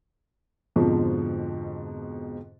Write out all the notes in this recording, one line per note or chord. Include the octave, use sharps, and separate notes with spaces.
F2 G#2 B2 D3 F3